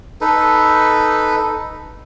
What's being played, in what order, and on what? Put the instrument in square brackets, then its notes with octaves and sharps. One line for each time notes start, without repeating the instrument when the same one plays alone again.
[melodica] D#4 A4 B4